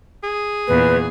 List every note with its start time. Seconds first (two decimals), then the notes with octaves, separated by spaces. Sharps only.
0.24 G#4
0.67 E2 A#2 B4